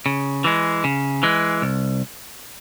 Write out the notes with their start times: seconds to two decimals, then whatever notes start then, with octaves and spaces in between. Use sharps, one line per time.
0.06 C#3
0.44 E3 G#3
0.84 C#3
1.23 E3 G#3
1.62 C2